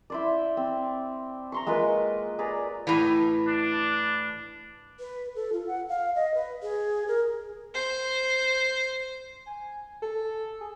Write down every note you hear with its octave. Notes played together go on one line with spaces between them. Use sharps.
E4 C5 D5
C4
A#5 C6 C#6
G#3 A#3 F4 B4
G#4 B4 D5 A#5
A2 E3
D4
B4
A4
F4
F#5
F5
D#5
B4
G#4
A#4
C5
G#5
A4
G#4